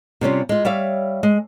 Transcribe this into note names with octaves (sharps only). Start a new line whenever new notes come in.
C3 G3 C#4 F4
G#3 F4
G3 C#5 E5 F5
G#3